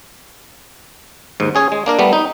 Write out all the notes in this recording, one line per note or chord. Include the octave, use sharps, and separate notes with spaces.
D#2 G#2
C#4 G#4 C#5
G#3
A#3 D4 A#4
G3 A3 B3
D#4